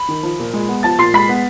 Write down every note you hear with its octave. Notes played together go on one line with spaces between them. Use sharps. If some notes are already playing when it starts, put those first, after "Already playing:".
Already playing: B5
D#3
F3
A#2
G#3
B3
F3 A5 A6
A#2 C6 C7
G#3 B5 B6
B3